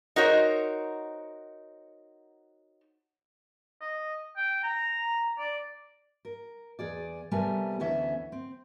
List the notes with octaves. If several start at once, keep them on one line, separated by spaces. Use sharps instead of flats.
D#4 F#4 A#4 C5 C#5
D#5
G5
A#5
D5
A#4
E2 G#4 D5
C3 G3 A3 B3 A#4 G#5
D2 E3 B3 C#4 E4 E5
C4